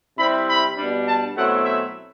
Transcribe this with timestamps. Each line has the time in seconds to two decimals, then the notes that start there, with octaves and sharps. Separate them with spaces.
0.17 C3 G3 C4 E4 B5
0.48 B5
0.77 B2 G3 D4
1.07 A5
1.36 B2 F#3 A3 C4 E4 F#5
1.65 E5